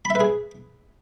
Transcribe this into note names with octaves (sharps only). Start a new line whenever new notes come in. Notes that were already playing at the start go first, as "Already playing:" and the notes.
B5
E5
B4
G#4